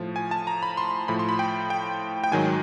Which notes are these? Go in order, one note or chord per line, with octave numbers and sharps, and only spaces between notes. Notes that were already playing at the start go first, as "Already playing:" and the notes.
Already playing: A2 F3
G#5
A5
A#5
B5
C6
A2 F3 B5
C6
B5
G5
G5
G5
G#2 D#3 F#3 G#5